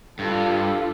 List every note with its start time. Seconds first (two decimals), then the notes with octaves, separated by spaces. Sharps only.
0.19 G2 F4 A4